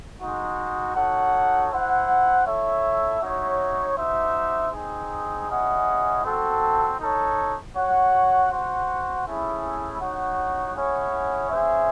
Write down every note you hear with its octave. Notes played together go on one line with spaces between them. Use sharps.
G#3 D#4 F#4
D#4 F#4 A4 C#5 F#5
E4 C5 F#5
E4 A4 C#5 E5
D#4 F#4 C#5 E5
D#4 F#4 C5 E5
C4 D#4 G#4
C#4 E4 G#4 D#5 F#5
C4 F#4 A4
D#4 A4 C#5
F#4 C#5 F#5
F#4 C5 F#5
A3 C#4 E4 G#4
D#4 F#4 C#5 F#5
C#4 E4 G#4 C#5 F#5
C#4 G#4 C5 E5